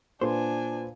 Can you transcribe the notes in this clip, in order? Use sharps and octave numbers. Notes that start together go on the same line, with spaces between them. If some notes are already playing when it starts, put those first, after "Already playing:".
A#2 D4 B4 C5 G#5